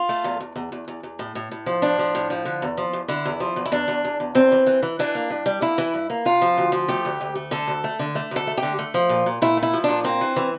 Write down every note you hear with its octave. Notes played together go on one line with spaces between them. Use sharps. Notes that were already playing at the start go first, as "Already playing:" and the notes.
Already playing: F4
A3
E2
E2
E2
E2
E2
E2
A2
A2
A2
F3
A2 D4
F3
A2
F3
D3
E2
F3
E2
D3 E4
E2
F3
E2
E4
E2 D4
E2
E2
E2
E2 C4
E3
E3
E3
E3 D4
A#3
G2
G3
A#3 E4
E3
G2
A#3
C3 F4
F3
D2
F3
A3 G4
D2
D2
A3
D3 A4
D2
A3
D3
A3
D2 A4
A3
G4
D3
A3
F3
A#2
A#2
A#2 E4
A3
E4
F3
A#2 D4
A#3 C4
E3
E3